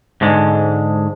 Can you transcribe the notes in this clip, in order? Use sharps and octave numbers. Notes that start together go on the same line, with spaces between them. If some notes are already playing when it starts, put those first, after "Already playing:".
G#2 D3 G#3